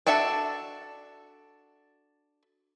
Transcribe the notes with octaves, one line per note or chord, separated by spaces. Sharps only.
D4 F#4 A4 E5 A5